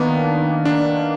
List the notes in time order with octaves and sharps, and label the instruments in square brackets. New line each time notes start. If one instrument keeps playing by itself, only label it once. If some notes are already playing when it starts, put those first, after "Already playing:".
Already playing: [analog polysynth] D#3 A#3 D4 [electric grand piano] B3
[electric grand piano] D4